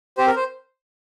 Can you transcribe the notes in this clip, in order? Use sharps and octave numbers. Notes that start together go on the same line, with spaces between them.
C4 G4 C5
A#4
C5